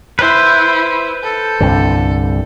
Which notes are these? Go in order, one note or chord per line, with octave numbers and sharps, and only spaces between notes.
E4 B4 C5
A4
C2 G2 D3